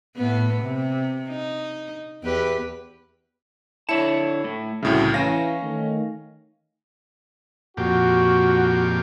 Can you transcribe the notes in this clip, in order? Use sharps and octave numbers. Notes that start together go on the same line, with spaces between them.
A2 B3
C3
D#4
E2 G4 B4
D3 E4 C#5 A5 C#7 E7
A2
C2 A2 C#3 A3 F#4
E3 C#4 F5 G#5 A#6
D#3 A3
F2 A#2 F#4 G4